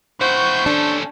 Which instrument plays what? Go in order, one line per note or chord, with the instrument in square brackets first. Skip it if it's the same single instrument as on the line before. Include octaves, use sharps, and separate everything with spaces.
[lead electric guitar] E4 F#4 [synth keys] C5 [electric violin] C#6 G6
[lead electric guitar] C#4 A4 [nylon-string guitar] D4